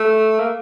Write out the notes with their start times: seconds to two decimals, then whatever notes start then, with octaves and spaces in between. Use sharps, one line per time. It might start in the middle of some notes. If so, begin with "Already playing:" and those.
Already playing: A3
0.40 A#3